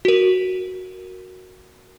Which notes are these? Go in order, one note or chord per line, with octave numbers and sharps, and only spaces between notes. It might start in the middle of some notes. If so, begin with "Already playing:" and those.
F#4 A#4